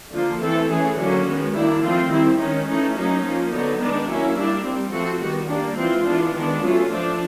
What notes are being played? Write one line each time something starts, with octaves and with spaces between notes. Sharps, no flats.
D3 F3 A#3 F4
E3 A3 C4 A4
E3 A3 C#4 G#4
D3 F#3 A#3 C#4 F#4
D#3 G#3 B3
D#3 G3 A#3 D4 E4
F3 A3 C4 F4
D#3 G3 C4 E4
D#3 G#3 C#4 D#4
E3 A3 C#4 D#4
F#3 A#3 C#4 D#4
F3 A#3 C#4
D3 F#3 B3 D#4
D#3 G#3 B3 D4
F#3 A#3 C#4 E4
G3 A#3 D4
G3 C4
F3 A3 C4 F#4
D#3 G3 B3 F#4
G3 A#3 D4
E3 G#3 C4 F4
E3 G#3 B3 D4
D#3 G#3 B3 D4
F#3 A3 C#4 F4
F3 A3 D4